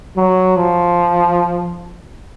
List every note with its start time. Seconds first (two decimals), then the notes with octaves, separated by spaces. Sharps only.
0.17 F#3
0.56 F3